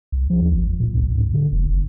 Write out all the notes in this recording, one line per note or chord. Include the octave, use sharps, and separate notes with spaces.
C2
F3
D#2
G#1
A#2
C#2
G#2
D3
F1
F#1